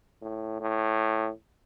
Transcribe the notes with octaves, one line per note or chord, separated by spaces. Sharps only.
A2
A2